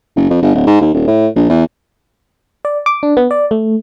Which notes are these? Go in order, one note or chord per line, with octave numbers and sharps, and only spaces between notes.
F#1
F2
G1
D1
G#2
D#2
D#1
A2
A#1
E2
D5
D6
D4
B3
D5
A3